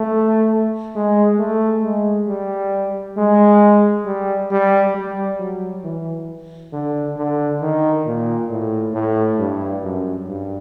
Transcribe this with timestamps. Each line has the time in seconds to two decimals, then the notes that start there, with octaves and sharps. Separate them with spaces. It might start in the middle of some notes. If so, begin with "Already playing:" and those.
Already playing: A3
0.95 G#3
1.39 A3
1.84 G#3
2.28 G3
3.17 G#3
4.06 G3
4.51 G3
4.95 G3
5.39 F#3
5.84 E3
6.73 D3
7.17 D3
7.61 D#3
8.06 A#2
8.50 A2
8.95 A2
9.39 G2
9.83 F#2
10.28 G2